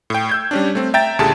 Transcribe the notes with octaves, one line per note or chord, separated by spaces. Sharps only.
A2 G5
E6 G6 G#6
G3 C#4 D4
A3 C4
E5 G5 A#5 A6
C#2 A#2 D3 G4 G#4 A5